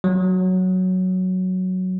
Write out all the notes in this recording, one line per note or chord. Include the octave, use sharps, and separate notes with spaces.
F#3